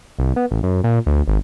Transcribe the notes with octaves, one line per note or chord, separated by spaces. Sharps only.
C2
B3
A1
F#2
A#2
D2
G#1